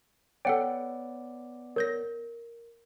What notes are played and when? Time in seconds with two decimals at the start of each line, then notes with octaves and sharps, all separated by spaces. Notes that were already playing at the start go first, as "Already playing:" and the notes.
0.45 B3 A4 C#5 D5 F#5 G5
1.76 A#4 C#5 G6 A#6